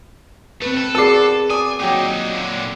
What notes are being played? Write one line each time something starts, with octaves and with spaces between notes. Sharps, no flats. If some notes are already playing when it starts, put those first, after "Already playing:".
A3 C4 B4
A4
F#4 G#4 A#4 B4 D5 A5 C7
D5 G#5 D6 D#6
A#2 F#3 D#4 G5 D6
A#2 D3